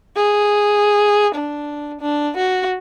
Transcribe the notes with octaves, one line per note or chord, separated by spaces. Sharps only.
G#4
D4
D4
F#4